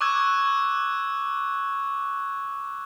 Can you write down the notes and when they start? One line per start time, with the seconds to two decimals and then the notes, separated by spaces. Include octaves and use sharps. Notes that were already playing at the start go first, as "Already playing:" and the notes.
0.01 C#6 D6 E6 F#6 G#6